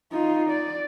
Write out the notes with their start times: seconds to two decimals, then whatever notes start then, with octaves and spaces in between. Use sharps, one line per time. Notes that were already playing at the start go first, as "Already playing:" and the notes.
0.13 D#4 F4
0.50 D5